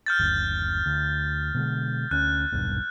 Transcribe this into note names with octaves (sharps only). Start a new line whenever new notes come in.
F6 G6 A6
F#1 D2
D2
B2 D3 G#3
D2 C#4 F#6
D#1 B1 G2